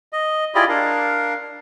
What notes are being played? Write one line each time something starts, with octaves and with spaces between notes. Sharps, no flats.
D#5
E4 F4 G4 G#4 D5 D#5
D4 A#4 F5